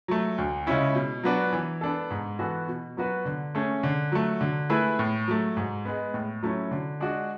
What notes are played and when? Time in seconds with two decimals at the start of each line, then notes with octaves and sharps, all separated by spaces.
0.08 F#3 A3
0.38 D2
0.67 C#3 G#3 C#4 E4
0.95 B2
1.24 F#3 B3 D4 F#4
1.53 E3
1.81 B3 D4 A4
2.11 G#2
2.39 E3 B3 F#4 A4
2.68 B2
2.97 F#3 B3 F#4 B4
3.25 D3
3.55 A3 C#4 G#4
3.83 D3
4.12 F#3 A3
4.41 D3
4.69 A3 E4 G#4 B4
4.99 A2
5.28 F#3 A3
5.57 G#2
5.85 G#3 B3
6.14 A2
6.43 F#3 A3 C#4 E4
6.71 D3
7.00 G#3 D4 F#4